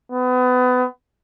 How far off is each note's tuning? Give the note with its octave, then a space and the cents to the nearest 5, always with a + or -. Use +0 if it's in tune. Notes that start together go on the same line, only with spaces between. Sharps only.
B3 +30